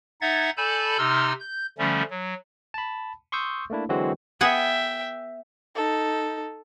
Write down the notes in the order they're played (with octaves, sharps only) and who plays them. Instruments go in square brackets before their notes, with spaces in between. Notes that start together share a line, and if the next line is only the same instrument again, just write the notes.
[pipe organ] D#4 E5 F#5 G#6 A6
A4 D5 G#5 A5 B5 G6
C3 D#4 C6 E6 F6
G6
D3 F3 G3 A3 C#4
F#3
[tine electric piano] A5 B5
C6 C#6 D#6 E6 G6
A3 A#3 D4 E4
D3 E3 F#3 G#3 C4 F#4
[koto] B3 G#4 F#5 [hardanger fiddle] E5 G5
[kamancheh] D#4 A4